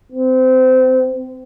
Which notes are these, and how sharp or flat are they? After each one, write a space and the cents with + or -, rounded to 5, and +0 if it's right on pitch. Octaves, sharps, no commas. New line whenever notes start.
C4 -25